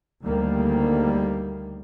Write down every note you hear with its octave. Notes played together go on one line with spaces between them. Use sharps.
D2 D#3 G3 A#3